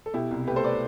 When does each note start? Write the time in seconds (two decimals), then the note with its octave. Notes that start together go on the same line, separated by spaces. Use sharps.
0.06 A4
0.14 B2 E4 G4
0.31 C2
0.47 A3 G4 B4
0.56 A4 C5
0.64 B4 D5